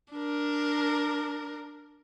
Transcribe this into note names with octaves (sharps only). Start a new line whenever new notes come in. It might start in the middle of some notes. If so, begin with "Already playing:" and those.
D4 A#4